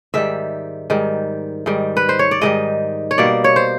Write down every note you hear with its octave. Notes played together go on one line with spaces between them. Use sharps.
G#2 D#3 G3 E5
G#2 D#3 G3
G#2 D#3 G3
B4
C5
C#5
D5
G#2 D#3 G3 D#5
C#5
B2 G3 A#3 D5
C#5
C5